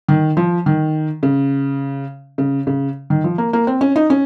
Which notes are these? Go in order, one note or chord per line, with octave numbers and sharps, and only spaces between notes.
D#3
F3
D#3
C#3
C#3
C#3
D#3
F3
A#3
A#3
C4
C#4
D#4
C#4